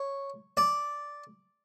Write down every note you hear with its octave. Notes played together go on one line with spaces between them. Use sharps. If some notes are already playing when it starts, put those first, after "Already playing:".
Already playing: C#5
D5